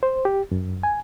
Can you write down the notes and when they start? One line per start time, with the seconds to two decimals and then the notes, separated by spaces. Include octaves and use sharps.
0.03 C5
0.25 G4
0.52 F#2
0.83 G#5